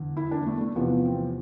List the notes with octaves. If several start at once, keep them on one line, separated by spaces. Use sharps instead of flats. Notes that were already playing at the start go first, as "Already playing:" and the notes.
Already playing: E2 D3
E4
D4
A3
A3
E2 C3 F3 B3
C4